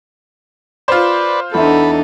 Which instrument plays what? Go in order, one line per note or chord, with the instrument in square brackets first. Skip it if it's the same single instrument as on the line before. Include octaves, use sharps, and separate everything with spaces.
[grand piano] F4 C5 [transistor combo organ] B4 D5
[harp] E2 E5 [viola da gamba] D4 D#4 A4 [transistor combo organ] B5